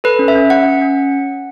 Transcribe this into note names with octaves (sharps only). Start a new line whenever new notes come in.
A4 B4
C#4
E5
C#4
C#4 F#5
C#4
C#4